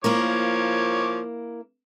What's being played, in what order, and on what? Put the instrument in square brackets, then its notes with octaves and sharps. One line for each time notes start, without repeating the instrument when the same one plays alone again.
[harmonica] F3 C#5 D6 [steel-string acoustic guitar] A#3 E4 A#4